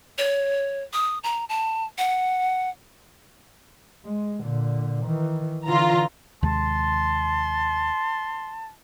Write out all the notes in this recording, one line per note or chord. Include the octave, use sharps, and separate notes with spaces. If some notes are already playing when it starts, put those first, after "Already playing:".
C#5
D#6
A#5
A5
F#5
G#3
A#2 D3
D#3 E3
D3 E3 F4 A#5
D#2 C3 G#3 A5 C6